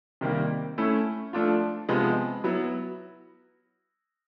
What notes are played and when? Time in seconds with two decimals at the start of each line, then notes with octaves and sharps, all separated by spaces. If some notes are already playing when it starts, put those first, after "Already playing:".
0.21 C3 D#3 G3 A#3
0.78 A3 C#4 E4
1.33 F3 A3 D4 F4
1.89 C3 F3 G#3 B3
2.44 F#3 B3 E4